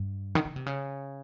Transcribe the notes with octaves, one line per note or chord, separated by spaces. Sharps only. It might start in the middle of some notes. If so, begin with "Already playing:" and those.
Already playing: G2
D#3
C#3
C3
C#3